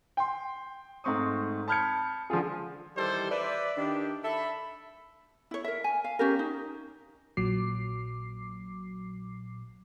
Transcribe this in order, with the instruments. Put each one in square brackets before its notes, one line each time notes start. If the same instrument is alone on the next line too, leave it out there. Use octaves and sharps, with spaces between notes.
[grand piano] G5 C6
G#2 A3 C4 C#6 D#6
A5 B5 F6 G6 G#6 C#7
D3 F3 D4 F4 G#4
[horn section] D#3 E3 G3 G4 A4 C5
B4 D5 E5
D#3 D4 G4
A4 E5 B5
[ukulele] E4 C#5
A#4 E5
G#5
F5
C#4 G4 A#4
D#4
[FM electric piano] A#1 A#2 F#3 D6 C7